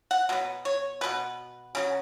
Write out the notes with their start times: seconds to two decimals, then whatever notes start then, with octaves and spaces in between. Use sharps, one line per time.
0.11 F#5
0.29 B2 F#3 B3
0.65 C#5
1.01 B2 F#3 B3 B4
1.75 C#3 F#3 C#4